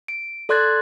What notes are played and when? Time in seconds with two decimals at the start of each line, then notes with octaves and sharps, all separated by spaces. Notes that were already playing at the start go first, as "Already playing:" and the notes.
0.08 D7
0.49 A4 D5 C6 F#6 G#6 A6